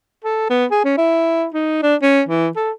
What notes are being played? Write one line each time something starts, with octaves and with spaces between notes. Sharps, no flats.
A4
B3
G#4
C#4
E4
D#4
D4
C#4
E3
A4